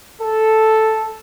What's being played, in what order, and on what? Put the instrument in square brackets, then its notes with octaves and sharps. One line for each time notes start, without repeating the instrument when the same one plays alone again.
[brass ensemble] A4